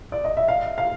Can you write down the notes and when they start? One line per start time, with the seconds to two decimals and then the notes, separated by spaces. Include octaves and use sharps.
0.12 D5
0.24 D#5
0.37 E5
0.48 F5
0.78 F5